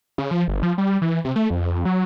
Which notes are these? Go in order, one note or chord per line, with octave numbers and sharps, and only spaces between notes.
C#3
F3
G1
F3
G3
E3
C3
A3
F2
F#3